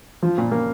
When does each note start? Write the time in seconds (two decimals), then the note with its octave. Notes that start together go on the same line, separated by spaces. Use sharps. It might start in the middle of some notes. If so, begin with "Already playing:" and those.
0.22 F3
0.38 A#2
0.52 A#3